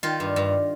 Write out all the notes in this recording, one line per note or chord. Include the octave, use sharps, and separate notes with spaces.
D#3 F4
G2
G2